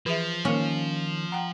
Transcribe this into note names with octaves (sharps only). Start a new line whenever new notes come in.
E3 F3 G#4 E5
D#3 A#3 C#4 A#4
F#5 G5 A#5